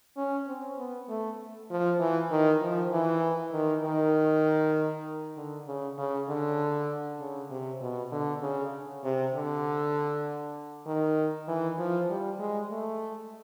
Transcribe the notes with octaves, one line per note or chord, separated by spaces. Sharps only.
C#4
C4
B3
A3
F3
E3
D#3
F3
E3
D#3
D#3
D3
C#3
C#3
D3
C#3
C3
B2
D3
C#3
C3
D3
D#3
E3
F3
G3
G#3
A3